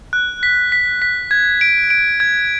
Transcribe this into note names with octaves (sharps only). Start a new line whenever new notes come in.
F#6
B6
B6
B6
G#6
D7
D7
G#6